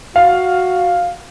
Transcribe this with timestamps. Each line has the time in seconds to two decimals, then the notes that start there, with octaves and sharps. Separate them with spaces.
0.16 F#4 F5